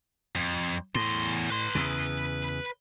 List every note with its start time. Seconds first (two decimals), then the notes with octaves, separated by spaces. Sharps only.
0.35 F2
0.95 E2 A2 C6
1.50 B4 C6
1.75 E2 C#3